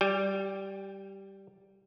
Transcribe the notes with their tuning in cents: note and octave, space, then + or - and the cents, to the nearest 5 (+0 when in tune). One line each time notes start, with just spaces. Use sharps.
G3 -10 G5 +30